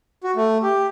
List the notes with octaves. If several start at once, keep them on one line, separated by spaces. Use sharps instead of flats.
F#4
A3
G4